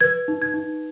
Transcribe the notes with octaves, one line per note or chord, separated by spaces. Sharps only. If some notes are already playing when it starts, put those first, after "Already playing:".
B4 G#6
D#4
G#6
D#4